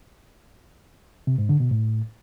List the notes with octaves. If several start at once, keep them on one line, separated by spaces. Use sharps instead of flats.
C3
G#2
D3
B2
A2